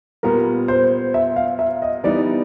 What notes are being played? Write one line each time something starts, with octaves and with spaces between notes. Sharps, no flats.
A#2 G3 B3 A#4
C5
E5
F5
E5
D#5
E3 G3 B3 D#4 D5